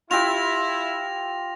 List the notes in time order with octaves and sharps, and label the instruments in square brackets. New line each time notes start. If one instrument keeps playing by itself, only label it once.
[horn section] E4 [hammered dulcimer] F4 G4 [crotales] A#6 F7